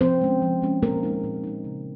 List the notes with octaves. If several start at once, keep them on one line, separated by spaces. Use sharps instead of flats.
F3 C4 C5
G#3 C#4
F3
G#3 C#4
A#2 A#3 A#4
G#3 D#4
A#2
G#3 D#4
C#3